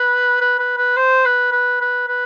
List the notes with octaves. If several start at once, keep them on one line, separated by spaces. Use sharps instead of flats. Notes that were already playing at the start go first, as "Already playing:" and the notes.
Already playing: B4
B4
B4
B4
C5
B4
B4
B4
B4